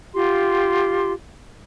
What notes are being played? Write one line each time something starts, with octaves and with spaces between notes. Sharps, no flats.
F4 G4 C6